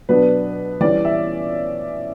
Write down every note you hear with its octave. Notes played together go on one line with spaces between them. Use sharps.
B2 F#3 B3 D4 B4
E3 G3 C#4 D5
E5